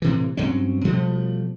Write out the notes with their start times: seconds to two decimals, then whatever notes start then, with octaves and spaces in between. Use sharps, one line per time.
0.02 A2 C3 E3
0.37 G2 F#3 C4 C#4
0.85 B2 F3 G3 A3